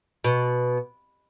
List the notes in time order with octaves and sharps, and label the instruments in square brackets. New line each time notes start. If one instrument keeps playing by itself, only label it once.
[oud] B2